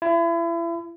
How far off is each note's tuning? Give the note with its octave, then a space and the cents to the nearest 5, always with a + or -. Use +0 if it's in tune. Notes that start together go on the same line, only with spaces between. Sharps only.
E4 +35